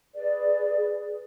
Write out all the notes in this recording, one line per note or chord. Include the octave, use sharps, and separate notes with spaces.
G#4 B4 D5